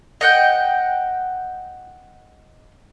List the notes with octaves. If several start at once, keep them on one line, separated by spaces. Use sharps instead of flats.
D#5 F#5 G5